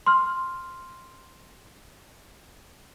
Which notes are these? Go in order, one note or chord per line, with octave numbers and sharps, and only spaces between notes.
C6 F6